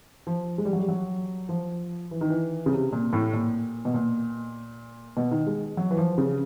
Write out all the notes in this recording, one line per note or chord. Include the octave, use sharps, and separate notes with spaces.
F3
G#3
G3
F#3
G3
F#3
F3
E3
D#3
E3
C#3
C3
A#2
A2
A#2
B2
A#2
B2
D#3
G#3
F#3
E3
F3
C#3